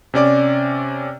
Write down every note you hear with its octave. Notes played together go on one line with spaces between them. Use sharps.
C3 C#4 D5 D6